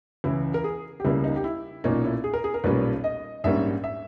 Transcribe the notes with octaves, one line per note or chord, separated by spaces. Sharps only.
C#2 C#3 E3 E4
A#4
G#4
G4
C#2 C#3 G3 A#3 E4
D#4
G4
E4
B1 A#2 A#3 C#4 D#4
E4
G#4
A#4
G#4
A#4
B1 A#2 G3 A#3 C#4 B4
D#5
A#1 G#2 G3 A#3 C#4 E5
E5